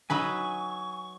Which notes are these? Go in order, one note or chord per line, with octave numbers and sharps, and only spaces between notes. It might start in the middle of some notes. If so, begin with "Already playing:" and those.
F#3 D#4 B4 G#5 C#6 E6